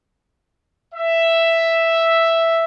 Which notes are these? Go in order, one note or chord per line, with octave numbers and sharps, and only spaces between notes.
E5